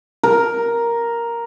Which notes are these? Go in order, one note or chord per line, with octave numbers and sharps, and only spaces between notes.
A#4